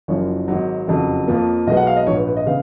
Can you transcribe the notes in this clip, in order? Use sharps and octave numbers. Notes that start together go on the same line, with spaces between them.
F#1 F#2 F3 C#5
G#1 G#2 F#3
F#1 F2 C#3 F#3
F2 F3 A#3
B1 B2 G#3 B3 D#5
F#5
F5
D#5
A#1 G#2 F3 C#5
B4
B4
D#5
C#3 B3 F5